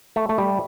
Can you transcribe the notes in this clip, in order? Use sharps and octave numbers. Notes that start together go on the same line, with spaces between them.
A3
A3
G3